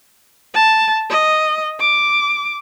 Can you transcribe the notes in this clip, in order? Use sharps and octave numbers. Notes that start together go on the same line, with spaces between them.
A5
D#5
D6